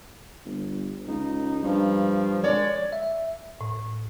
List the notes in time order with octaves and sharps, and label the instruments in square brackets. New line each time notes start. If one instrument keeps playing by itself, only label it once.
[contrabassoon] G1
[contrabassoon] C#2 [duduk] D#4
[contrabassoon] G2 [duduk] F3
[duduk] G#3 [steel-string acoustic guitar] C#5 D5
[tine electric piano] E5
[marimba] A2